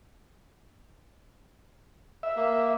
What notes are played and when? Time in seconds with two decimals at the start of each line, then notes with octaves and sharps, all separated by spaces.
2.23 E5
2.36 A#3